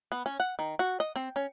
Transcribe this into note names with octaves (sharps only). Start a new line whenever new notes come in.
B3
C#4
F#5
D#3
F#4
D#5
C4
C#4